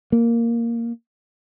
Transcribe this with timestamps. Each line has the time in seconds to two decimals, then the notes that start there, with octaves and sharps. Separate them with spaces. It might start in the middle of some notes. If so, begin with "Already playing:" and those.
0.12 A#3